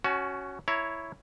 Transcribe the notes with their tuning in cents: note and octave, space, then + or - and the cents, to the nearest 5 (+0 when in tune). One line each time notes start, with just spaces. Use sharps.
C#4 +0 F#4 +10 A5 -45
E4 +0 C#5 +0 A#5 +0